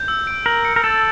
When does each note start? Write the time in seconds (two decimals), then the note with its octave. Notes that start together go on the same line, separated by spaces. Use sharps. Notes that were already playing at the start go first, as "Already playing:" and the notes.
Already playing: G6
0.08 E6
0.27 D7
0.46 A#4 F#7
0.65 C#7
0.76 A#4
0.83 A4 A6